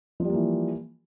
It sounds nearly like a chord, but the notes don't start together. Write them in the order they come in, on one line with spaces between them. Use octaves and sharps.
F3 G3 A#3 E3